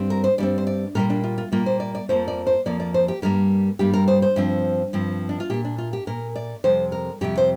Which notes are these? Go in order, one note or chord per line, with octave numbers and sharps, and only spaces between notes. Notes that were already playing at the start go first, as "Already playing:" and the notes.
Already playing: G2 G3 C4
A#4
C5
G2 G3 C4 D5
C5
D5
A#2 G3 A#3 A#4
D4
F4
F4
A#2 G3 A#3 F4
C5
D5
D5
F2 F3 A#3 C5
D5
C5
F2 F3 A#3 D5
D5
C5
G4
G2 G3 A#3 A#4
G2 G3 A#3 G4
A#4
C5
C5
G2 F3 C4
G2 F3 C4
D4
F4
A#2 A#3 G4
D4
F4
G4
A#2 A#3 A#4
D5
F2 C3 G3 C5
A#4
F2 C3 G3 G4
C5